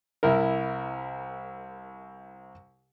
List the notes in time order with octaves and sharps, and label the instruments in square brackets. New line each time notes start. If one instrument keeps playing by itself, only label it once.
[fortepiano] C2 E4 A#4